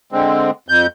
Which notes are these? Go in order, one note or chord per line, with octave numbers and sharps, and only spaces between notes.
D3 G#3 C4
F2 G6